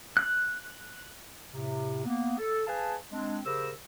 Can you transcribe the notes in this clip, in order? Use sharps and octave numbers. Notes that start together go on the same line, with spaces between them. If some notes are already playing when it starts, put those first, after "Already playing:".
F#6
A2 C3
A#3 B3
A4
G#4 B4 F5 G#5 A5
G#3 C4 D4
C#3 G4 A#4 C5 E6